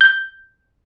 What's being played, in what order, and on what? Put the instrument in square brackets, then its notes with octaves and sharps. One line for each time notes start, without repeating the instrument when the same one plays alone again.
[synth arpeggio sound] G6